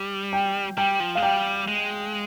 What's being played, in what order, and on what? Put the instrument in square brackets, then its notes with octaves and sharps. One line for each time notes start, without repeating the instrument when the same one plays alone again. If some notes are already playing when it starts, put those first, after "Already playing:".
Already playing: [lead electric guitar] G3
[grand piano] G5
[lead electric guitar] G3 [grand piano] G5
[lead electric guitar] F3
[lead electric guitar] G#3 [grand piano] F5
[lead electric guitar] G3 [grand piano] G5
[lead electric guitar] G#3